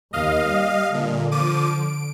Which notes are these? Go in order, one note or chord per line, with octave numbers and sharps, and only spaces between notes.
D#2 D#5 F5
G3
A#2 D3
F3 D6 D#7
D7